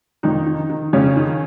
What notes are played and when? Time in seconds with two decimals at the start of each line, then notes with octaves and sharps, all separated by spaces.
0.23 F2 D#3 D#4
0.46 D#3
0.69 D#3
0.93 F2 C#3 C#4
1.16 D#3